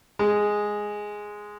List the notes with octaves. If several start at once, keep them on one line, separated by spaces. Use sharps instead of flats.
G#3